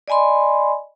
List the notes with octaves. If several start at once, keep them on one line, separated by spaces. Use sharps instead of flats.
D5 D#5 G#5 B5 C6